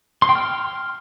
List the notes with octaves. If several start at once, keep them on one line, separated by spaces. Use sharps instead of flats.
C6
G5
F6